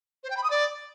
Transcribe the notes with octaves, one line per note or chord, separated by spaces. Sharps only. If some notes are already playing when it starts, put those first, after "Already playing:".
C5
G5
B5
D#6
D5